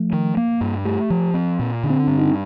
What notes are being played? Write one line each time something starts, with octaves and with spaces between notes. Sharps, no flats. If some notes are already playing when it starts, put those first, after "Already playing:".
Already playing: F3 A3
D#3
A#3
G2
A3 G4
F3
C4
A#2
D3
C4
G2 D4
D#4